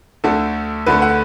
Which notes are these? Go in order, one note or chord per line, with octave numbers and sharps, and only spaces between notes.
D2 D3 A3 A4
D2 D3 A3 B4
F#5